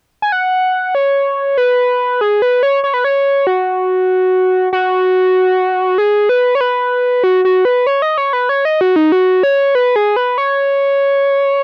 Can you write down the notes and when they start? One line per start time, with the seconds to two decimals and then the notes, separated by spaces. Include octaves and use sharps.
0.22 G#5
0.32 F#5
0.95 C#5
1.58 B4
2.21 G#4
2.42 B4
2.63 C#5
2.84 C#5
2.94 B4
3.04 C#5
3.47 F#4
4.73 F#4
5.98 G#4
6.29 B4
6.55 C#5
6.61 B4
7.24 F#4
7.45 F#4
7.65 B4
7.87 C#5
8.02 D#5
8.18 C#5
8.33 B4
8.49 C#5
8.65 D#5
8.81 F#4
8.96 D#4
9.12 F#4
9.43 C#5
9.75 B4
9.96 G#4
10.16 B4
10.38 C#5